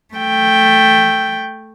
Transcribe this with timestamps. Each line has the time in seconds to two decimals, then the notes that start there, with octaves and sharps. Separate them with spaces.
0.14 A3 G5